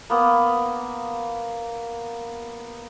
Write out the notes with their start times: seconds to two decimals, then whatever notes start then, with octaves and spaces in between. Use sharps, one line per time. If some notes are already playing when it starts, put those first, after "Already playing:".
0.10 A#3 B3